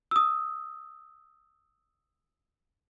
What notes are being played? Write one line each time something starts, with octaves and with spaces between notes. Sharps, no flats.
D#6 E6